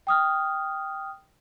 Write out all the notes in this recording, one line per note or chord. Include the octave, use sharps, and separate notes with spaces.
G5 D#6 F6